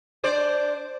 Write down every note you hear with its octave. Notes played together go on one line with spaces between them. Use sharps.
D4 C5 D5